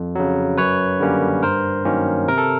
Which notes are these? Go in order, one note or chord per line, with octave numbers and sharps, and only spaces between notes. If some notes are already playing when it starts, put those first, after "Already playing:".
Already playing: F2
C#3 F#3
F#2 B4 C#5
D3 G3 A#3 C#4
G2 A#4 C5
D#3 F#3 A#3 C#4
C3 A#4
A4